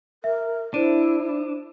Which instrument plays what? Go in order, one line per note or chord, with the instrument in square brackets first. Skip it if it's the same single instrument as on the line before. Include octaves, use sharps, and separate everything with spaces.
[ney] A#4 [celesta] E5
[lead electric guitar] D4 [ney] E4 [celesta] C5 D#7